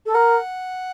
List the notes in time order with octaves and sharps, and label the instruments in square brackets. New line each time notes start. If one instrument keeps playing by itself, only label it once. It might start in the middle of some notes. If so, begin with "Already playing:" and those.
[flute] A4
[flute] A#4 [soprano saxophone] F#5